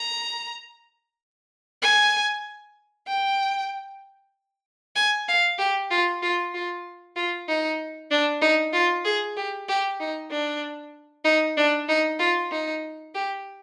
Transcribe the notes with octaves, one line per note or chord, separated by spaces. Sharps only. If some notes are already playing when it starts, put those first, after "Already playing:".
Already playing: A#5
G#5
G5
G#5
F5
G4
F4
F4
F4
F4
D#4
D4
D#4
F4
G#4
G4
G4
D#4
D4
D#4
D4
D#4
F4
D#4
G4